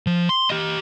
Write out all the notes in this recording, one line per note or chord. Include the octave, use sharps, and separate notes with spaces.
F3
C6
G4 D#5